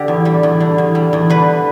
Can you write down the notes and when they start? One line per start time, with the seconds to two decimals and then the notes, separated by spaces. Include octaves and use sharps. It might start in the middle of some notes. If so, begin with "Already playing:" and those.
Already playing: D3 G4
0.08 E2
0.25 G3
0.43 E2
0.60 D3
0.78 E2
0.95 G3
1.13 E2
1.30 D3 B4